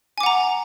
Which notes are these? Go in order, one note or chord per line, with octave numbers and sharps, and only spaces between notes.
F#5 G#5 A#5 D6